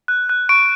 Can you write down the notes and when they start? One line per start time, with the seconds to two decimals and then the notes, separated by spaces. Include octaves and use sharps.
0.08 F#6
0.29 F#6
0.49 C#6 D7